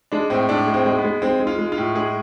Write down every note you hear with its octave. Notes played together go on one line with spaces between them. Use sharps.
G#3 D4
A2 C4
A2 D4
G#3
C4
G#3
B3
G#3
G#3 C4
G#3
F4
G#3
F4
A2
G#3 G#4